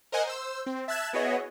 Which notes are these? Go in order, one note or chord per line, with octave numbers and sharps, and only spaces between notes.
A#4 C5 D#5 F#5 G#5
C5 E6
C4
E5 A5 E6 F#6 G#6 E7
B3 E4 F#4 G#4 C#5 D#5